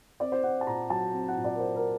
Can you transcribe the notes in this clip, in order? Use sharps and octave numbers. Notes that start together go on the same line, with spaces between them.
C4 D5
C5
C4 F#5
A5
A#2 A#5
F#3 A5
C4
F#5
A#2
D5
A#4
F#3 C5
A#4